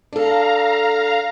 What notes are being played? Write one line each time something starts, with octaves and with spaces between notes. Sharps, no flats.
D4 A4 F5 A#5